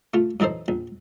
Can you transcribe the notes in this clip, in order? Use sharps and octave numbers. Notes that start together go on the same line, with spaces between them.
A3 F4
F#2 E3 D#4 A4 C5
A#1